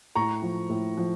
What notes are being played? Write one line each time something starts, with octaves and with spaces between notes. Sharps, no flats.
A2 A#5 C#6
F3
A2
F3